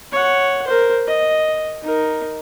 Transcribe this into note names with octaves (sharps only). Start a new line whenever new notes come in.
C#5 F#5
A#4 C5
D#5
D#4 A#4